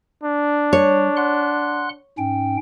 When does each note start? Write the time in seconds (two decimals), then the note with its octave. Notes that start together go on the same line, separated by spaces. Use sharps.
0.23 D4
0.73 G3 C#5
1.17 F#5 C6 F#6
2.18 G#2 C#4 G5